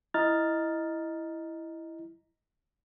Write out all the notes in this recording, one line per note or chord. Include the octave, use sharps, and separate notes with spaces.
E4 D#5 A#5 F6 A6